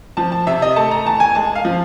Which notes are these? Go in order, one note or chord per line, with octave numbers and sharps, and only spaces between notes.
F3 A5
A5
C3 E5
D#5
A3 A5
A#5
E2 A5
G#5
G#3 A5
F5
F3